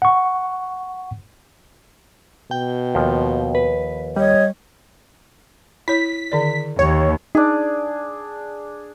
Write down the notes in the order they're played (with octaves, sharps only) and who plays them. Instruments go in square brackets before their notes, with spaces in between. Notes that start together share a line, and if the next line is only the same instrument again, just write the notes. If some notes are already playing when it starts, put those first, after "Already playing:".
[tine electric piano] F#5 C#6
[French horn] B2 [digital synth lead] G5
[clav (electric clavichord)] D#2 F3
[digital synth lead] B4
[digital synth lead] G3 [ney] C#5 [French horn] D#5
[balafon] E4 C#5 [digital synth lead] B6
[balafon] D3 D#3 D5
[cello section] D#2 [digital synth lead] C#5
[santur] D4 G#4 [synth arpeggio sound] D#4